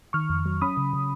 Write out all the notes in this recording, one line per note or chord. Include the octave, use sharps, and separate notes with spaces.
D#3 C#6 F6
F2
F#3
C#4 B5 D#6
C#3
C#3